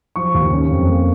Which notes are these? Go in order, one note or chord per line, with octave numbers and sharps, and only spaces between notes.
F3 C#6
D#2
C#4
F2
A#3